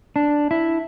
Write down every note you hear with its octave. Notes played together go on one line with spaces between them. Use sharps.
D4
E4